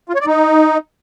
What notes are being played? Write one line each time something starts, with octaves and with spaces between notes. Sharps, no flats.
F4
C#5
D5
D#4